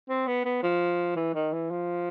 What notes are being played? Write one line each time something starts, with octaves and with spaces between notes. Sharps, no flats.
C4
B3
B3
F3
E3
D#3
E3
F3